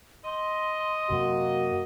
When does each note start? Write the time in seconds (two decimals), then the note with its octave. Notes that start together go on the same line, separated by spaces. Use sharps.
0.24 D#5 C6
1.10 F#2 C3 A#3 F#4